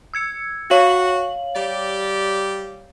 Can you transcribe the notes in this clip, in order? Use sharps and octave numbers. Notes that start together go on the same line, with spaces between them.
E6 G#6 C#7
F#4 C#5 F5 F#7
G3 G4 D5